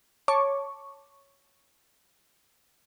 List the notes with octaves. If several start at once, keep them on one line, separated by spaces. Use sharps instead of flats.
C#5 A5 C#6 D6